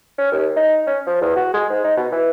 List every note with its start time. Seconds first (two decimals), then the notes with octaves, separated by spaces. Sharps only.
0.18 C#4
0.32 D#2
0.56 D#4
0.87 C#4
1.07 F3
1.21 E2
1.36 F#4
1.54 G#3
1.70 G#2
1.84 D#4
1.97 B2
2.12 E3